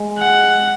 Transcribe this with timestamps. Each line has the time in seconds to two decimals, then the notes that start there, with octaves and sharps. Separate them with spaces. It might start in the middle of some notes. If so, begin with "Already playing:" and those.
Already playing: G#3
0.19 F#5